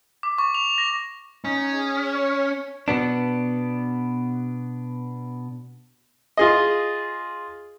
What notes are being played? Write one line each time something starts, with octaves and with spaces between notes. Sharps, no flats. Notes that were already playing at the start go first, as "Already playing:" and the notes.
D6
C#6
F7
A#6
C#4 D#4
G#4
C#5
B2 B3 D4
F4 G#4 D#5